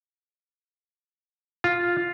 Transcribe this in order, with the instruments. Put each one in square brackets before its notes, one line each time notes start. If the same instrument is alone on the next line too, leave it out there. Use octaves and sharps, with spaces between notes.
[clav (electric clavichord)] F4